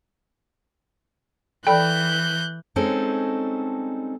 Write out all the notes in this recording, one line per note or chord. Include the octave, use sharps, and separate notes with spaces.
E3 A4 D5 G5 B5 F#6 G6
G3 G#3 C4 C#4 D#4 A4